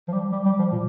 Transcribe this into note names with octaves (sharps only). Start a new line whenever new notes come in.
F3
G3
G3
G3
F3
A#2